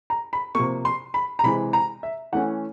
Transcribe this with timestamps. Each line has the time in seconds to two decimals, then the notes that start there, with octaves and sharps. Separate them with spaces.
0.10 A#5
0.33 B5
0.55 C3 F3 A#3 C#6
0.85 C6
1.14 B5
1.39 A#5
1.43 C3 E3 G#3 B5
1.73 A#5
2.03 E5
2.33 E3 A3 C#4 F#5